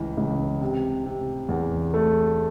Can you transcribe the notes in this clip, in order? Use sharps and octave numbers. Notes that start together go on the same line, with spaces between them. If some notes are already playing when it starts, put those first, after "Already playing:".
Already playing: C#2 E3
C#2
C3
C3
E2
A3